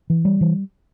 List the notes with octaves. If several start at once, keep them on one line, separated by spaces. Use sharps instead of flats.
E3
G3
E3